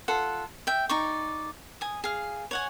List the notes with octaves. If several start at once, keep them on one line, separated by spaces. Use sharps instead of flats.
F4 A4 F#5
E5 G5
D#4 D5 C#6
G#5 D#6
G#4 F5
C#5 F#5 G#5